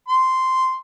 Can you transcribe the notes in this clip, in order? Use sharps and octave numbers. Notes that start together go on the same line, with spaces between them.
C6